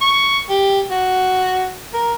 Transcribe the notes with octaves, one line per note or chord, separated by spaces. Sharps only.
C#6
G4
F#4
A#4